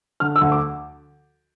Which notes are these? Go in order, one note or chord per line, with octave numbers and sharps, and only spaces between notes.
D3 F6
E6
D2
D6